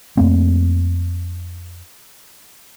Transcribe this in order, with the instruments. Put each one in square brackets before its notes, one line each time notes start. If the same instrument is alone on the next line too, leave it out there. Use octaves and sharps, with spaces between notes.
[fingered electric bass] F2 A3 A#3 C4